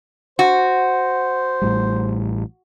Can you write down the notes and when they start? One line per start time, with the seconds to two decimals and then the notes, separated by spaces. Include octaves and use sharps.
0.39 F#4 C5
1.62 A1 A2 G3